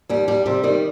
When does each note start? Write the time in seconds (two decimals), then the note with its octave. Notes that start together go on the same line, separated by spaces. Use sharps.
0.09 D#2 G3
0.28 D#2 G3
0.46 C3 G3
0.63 D#3 G3